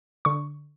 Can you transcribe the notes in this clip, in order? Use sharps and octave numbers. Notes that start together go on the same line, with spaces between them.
D3 C#6